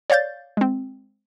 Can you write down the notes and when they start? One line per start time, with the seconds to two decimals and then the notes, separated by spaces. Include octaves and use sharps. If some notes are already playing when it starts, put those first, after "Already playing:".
0.10 C#5 D5 F5 G6 A6
0.57 G#3 C4